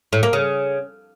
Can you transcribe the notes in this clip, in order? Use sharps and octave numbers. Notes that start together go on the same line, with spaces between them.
A2
A#3
C#3